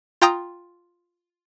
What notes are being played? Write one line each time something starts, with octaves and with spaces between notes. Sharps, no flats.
F4 G5 A#5 D#6